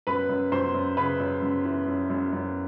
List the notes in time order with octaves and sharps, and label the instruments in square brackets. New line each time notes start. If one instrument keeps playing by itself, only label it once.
[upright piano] F#2 B4 B5
F#2
F#2 C5 C6
F#2
C#3 B4 B5
F#2
F#2
E3
F#2
F#2
F#2